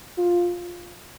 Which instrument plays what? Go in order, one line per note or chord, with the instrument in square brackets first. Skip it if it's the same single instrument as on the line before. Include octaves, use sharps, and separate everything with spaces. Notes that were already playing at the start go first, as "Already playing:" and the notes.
[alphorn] F4